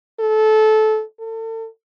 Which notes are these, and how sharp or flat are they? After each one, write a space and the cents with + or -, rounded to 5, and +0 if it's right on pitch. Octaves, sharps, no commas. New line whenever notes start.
A4 -20
A4 +35